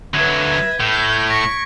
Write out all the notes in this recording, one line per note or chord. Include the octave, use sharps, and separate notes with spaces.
D3 F#3 B4 E5 G#6
A2 G6
C#6 A#6 B6 D7